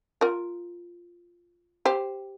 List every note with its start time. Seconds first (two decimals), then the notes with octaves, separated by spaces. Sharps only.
0.21 F4 A#4
1.85 G4 C5